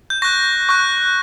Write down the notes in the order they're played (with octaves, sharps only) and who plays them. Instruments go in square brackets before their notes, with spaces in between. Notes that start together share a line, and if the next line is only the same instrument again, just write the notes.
[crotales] G6
C#6 F#6 A#6
C#6 F#6